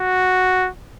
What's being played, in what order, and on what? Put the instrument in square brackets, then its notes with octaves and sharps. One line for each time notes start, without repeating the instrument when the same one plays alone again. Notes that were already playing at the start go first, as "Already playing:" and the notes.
Already playing: [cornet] F#4